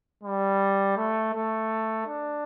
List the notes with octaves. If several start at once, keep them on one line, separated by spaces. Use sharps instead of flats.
G3
A3
A3
D4